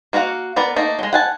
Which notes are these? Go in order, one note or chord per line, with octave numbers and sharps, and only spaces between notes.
A#3 F#4 F5 F#5
B3 A#4 D5
A3 A#3 D#4
F#3 G#3
F#5 G#5 A5